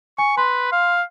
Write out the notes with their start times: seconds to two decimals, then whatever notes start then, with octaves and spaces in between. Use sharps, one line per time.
0.18 G#5 C#6
0.37 B4 C6
0.72 F5